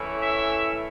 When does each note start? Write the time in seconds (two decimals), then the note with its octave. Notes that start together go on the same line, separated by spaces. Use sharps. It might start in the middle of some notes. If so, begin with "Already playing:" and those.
Already playing: A2 E3 A3 C#4 E4
0.21 E5